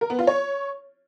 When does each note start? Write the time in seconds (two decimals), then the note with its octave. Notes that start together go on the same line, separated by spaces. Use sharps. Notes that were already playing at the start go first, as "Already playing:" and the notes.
0.01 A#4
0.10 B3
0.19 F4
0.27 C#5